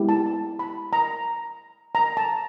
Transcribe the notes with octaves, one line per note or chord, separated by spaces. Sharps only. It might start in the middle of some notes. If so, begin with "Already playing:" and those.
Already playing: G#3 B3 E4 G4
A5
A5
B5
A#5
A#5
A5